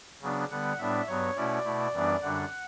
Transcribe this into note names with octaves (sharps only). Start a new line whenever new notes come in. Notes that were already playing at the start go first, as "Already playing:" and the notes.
C#3 F#3 B3 D4
D3 G3 B3 F#5
A2 G3 B3 D4 E5
G2 F#3 B3 C#5
B2 A3 C#4 E4 D5
B2 A3 E4
F#2 E3 G3 B3 D4
F#2 D3 G3 D4 F#5